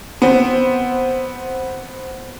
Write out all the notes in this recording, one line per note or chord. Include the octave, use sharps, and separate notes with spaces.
B3 C4